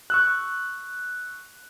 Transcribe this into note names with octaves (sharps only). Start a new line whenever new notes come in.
C#6 E6 F#6